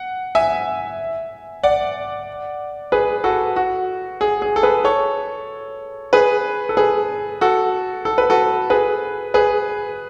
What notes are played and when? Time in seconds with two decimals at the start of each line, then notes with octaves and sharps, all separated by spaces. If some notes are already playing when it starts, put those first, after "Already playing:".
Already playing: F#5
0.35 E5 G#5
1.63 D5 F#5
2.92 G#4 B4
3.24 F#4 A4
3.56 F#4
4.21 G#4
4.42 G#4
4.56 A4
4.63 G#4 B4
4.84 A4 C#5
6.13 G#4 B4
6.69 A4
6.77 G#4 B4
7.41 F#4 A4
8.05 A4
8.18 B4
8.30 F#4 A4
8.70 G#4 B4
9.34 G#4 B4